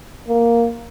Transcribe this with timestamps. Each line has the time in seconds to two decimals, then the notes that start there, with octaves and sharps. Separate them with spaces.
0.28 A#3